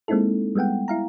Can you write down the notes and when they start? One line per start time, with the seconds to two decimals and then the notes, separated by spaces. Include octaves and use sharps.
0.08 G#3 A#3 C4 D#4 E4 A4
0.55 G3 G#3 B3 F#5 G5
0.88 E4 F5 A#5